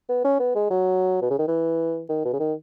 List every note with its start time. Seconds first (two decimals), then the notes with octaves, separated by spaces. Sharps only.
0.09 B3
0.25 C#4
0.40 B3
0.56 G#3
0.70 F#3
1.22 B2
1.31 C#3
1.39 D#3
1.48 E3
2.09 D#3
2.25 B2
2.33 C#3
2.40 D#3